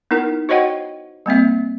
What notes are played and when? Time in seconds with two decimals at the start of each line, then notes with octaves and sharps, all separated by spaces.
0.11 B3 D#4 E4 A#4
0.49 F#4 C5 C#5 D#5 F#5 G5
1.26 G3 A#3 C4 E5